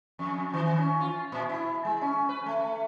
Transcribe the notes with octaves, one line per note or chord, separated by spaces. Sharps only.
F2
D#3
C#4
F4
A#2
E4
G#3
C#4
B4
A3